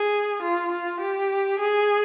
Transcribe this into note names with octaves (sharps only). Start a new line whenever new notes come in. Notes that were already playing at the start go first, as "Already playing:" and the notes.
Already playing: G#4
F4
F4
G4
G#4